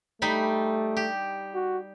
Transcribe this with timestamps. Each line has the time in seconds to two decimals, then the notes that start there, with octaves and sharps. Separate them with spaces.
0.22 G3 A3 D#4 B5
0.97 G4
1.54 F#4